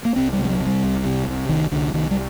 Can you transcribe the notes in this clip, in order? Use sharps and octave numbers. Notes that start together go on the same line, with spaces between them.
A#3
C2 C4
G3
C3
G3
F#3
C3
G3
C2
C3
C2
C2 D#3
C2 D3
C2 D#3
G3